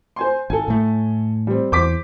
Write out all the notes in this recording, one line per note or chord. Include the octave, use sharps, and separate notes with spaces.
C5 G#5 C6
G#1 A4 G#5
A2 A3
G3 C4
E2 C5 D6 B6